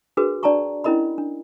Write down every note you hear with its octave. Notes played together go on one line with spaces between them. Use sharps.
D4 F#4 G#4 A#4 B4
D4 D5 G5 A5 A#5 C#6
C#4 D4 E4 A#4 D#5 B5
D4